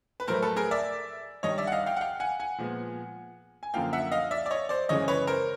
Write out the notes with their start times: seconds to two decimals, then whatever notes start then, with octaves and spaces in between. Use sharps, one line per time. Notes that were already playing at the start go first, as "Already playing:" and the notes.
0.20 B4
0.27 A2 F#3 A3 A#4 C5
0.42 A4 B4
0.56 G#4 A#4
0.71 D5 E5
1.43 G2 D#3 G3 C#5 D#5
1.58 D5 E5
1.67 F#5
1.72 D#5 F5
1.86 F5 G5
1.96 F#5
2.01 F5 G5
2.20 F#5 G#5
2.40 F#5 G#5
2.58 A#2 F3 G#3 B3
3.63 G#5
3.74 F#2 D3 F3 A#3 F5 G5
3.93 E5 F#5
4.12 D#5 F5
4.31 D5 E5
4.46 D5
4.50 C#5 D#5
4.69 C5 D5
4.89 F#2 C#3 E3 G#3 C#5 D#5
5.08 B4 C#5
5.27 A#4 C5